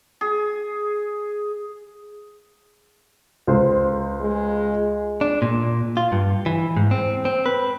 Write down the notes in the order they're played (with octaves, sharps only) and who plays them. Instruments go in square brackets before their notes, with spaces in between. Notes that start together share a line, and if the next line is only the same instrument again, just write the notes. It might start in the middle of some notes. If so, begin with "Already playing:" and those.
[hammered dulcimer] G#4
[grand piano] C#2 C5
[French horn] G#3
[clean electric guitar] D4
A#2
F4
G2
E3
G#2
C4
C4
B4